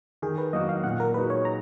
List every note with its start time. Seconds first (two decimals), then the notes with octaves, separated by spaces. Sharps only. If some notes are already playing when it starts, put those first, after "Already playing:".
0.22 D#3 G#4
0.38 B4
0.53 F#3 A#3 D#4 F#4 D#5
0.69 F5
0.84 A#2 F#5
1.00 A#4
1.14 G#3 D#4 F#4 B4
1.30 C#5
1.45 A#5